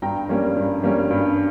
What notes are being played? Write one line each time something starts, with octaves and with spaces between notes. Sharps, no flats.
G2 G5 A#5
G3 A#3 C#4
G2
G3 A#3 C#4
G2